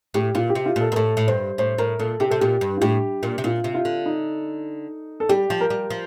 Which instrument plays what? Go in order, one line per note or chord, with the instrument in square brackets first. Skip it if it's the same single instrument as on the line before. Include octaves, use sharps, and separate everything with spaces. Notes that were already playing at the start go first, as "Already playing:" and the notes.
[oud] A2 [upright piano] G4
[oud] A#2 [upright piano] F4
[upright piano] G4
[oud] C3
[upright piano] F4
[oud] A#2 [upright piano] A4
[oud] A#2 [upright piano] A#4
[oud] A2 [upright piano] A4
[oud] A2
[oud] G2 [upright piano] C5
[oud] A2 [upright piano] C5
[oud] A2 [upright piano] A#4
[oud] A#2 [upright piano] A4
[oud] C3 [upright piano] G4
[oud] C3 [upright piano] A4
[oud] A#2 [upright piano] G4
[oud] G2
[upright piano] F4
[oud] A2 [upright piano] G4
[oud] A#2
C3
[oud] A#2 [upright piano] F4
[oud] C3
[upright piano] F4
[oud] D3
[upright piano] D#4
A4
[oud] G3 [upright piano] G4
[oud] F3
[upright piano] A#4
[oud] G3
F3